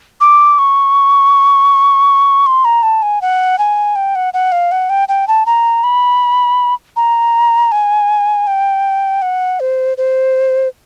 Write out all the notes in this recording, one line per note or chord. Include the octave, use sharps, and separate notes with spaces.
D6
C#6
C6
A#5
A5
G#5
F#5
G#5
G5
F#5
F#5
F5
F#5
G5
G5
A5
A#5
B5
A#5
G#5
G5
F#5
C5
C5